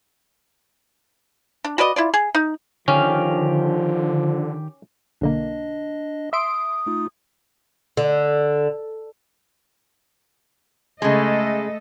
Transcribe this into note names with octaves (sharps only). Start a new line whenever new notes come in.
D4
F#4 B4 D5 D#5
E4 F4 D5
G#4
D#4
D3 D#3 F3 C#4 G4 F5
B1 D3 A#3 D4 D#5
E5 C6 D#6 D7
A3 D#4 F4
D3
C#3 G#3 A3 A4 D#5